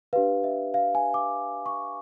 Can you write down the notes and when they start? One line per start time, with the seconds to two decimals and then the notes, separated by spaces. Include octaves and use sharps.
0.13 D4 G4 B4 F5
0.44 E5
0.74 F5
0.95 G#5
1.14 D6
1.66 C#6